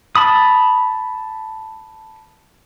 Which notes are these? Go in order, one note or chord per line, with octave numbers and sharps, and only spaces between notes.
A5 B5 D#6